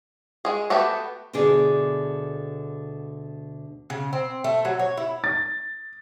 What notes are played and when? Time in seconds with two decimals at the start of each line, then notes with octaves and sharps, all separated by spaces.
0.45 G#3 G#4
0.70 A3 B3 F#4 G4 A4
1.33 D2 B2 D3 G#4 D5
3.90 C#3
4.13 C4
4.44 A3
4.65 F#3
4.79 C#5
4.97 E4
5.24 A6